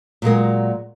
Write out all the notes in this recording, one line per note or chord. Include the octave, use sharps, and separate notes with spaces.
A#2 F#3 G#3 A#4